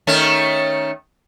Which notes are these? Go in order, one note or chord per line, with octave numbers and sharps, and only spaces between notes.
D#3 A3 C#4